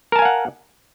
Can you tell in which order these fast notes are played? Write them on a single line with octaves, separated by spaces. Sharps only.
A#4 A5 G#5 F5 F#5